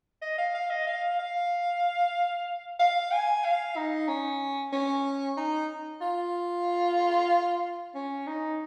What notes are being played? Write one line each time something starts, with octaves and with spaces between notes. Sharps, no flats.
D#5
F5
F5
D#5
F5
F5
F5
G#5
F5
D#4
C#4
C#4
D#4
F4
C#4
D#4